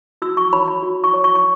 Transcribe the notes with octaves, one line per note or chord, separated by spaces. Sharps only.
F#4 E6
C#6
C#5 B5
B5
F#4
C#6
C#5
C#6
C#6